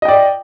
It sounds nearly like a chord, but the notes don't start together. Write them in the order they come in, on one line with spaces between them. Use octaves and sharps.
D#5 G5 D5